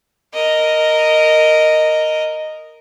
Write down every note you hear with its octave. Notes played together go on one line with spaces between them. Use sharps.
A#4 D#5